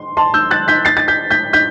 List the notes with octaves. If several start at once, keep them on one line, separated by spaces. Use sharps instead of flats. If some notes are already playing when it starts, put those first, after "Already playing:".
Already playing: C6
A5 C6
E6 G6
F#6 A6
G6 B6
A6 C7
A6
G6 B6
G6 B6
G6 B6